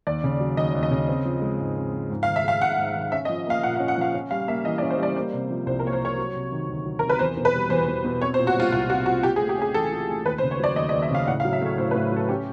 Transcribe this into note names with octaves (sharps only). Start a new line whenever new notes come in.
D#2 D5
C#3
F#3
D#2 D#5
D#2
D#5
C#3
C4
F3
G#3
G#2
C4
F3
G#2
F5
D#3
E5
G#3 F5
G#2 F#5
G#2
D#3
C#4 E5
D#5
F3
A#3 F5
A#2 F#5
F5
C#4
F#5
F3 F5
C#4
G3 F5
A#3 E5
E3 D#5
D5
C#4
C5
G3 D5
A#3 C5
C3
F3
C2 C5
A#4
A#3 C#5
C5
C3 C#5
F#3
C3
D#3
D2
F#3
C3 A#4
B4
E2 C5
B2
B4
G3
E2 C5
E2
B2
C4 C#5
C5
A#2
F#4
G3 F4
C2 F4
C4 F#4
A#2 F#4
F4 G4
G#4
A3
G4
C#4 G#4
E3 A4
F4
A3
D#2 B4
C5
C#3
C#5
F#3 D5
D#2 D#5
D#5
D#2
E5
C#3 F5
A2 F#5
F5
F#3
E5
A3 C#5
A2 C5
B4
A2
F#3 A4
C#4 G4